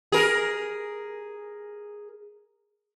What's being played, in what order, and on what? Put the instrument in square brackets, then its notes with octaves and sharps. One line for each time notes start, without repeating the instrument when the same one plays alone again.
[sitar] G#4 A#4